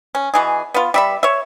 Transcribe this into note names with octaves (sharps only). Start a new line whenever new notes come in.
C#4
B2 E3 G#4
B3 F4
G3 E5 B5
C#5 E5